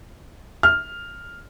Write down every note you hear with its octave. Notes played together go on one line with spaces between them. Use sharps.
F6